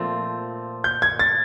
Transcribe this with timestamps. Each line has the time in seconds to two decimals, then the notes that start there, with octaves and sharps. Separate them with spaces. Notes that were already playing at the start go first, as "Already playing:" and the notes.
Already playing: A#2 F3 A3 C4
0.84 G6
1.02 G#6
1.19 A6